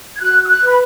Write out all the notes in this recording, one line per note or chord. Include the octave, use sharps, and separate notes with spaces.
G#6
F#4 F#6
E6
F#6
B4 B5